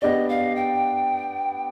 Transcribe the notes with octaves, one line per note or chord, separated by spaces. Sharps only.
B3 D4 G4 D5 D#5
F5
G5